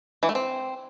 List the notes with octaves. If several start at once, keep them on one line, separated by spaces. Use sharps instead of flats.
E3
A3
C4